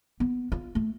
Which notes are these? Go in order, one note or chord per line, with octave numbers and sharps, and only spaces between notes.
B3
F4
A3